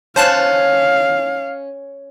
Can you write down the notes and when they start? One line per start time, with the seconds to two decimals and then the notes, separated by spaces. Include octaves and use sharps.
0.16 C#4 C5 F5 A5 F#6